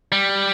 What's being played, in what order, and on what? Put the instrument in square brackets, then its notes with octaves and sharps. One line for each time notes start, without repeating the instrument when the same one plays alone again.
[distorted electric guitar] G3